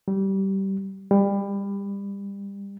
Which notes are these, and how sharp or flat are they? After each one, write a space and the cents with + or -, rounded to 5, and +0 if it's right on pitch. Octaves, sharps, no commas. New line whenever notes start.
G3 -20
G3 +25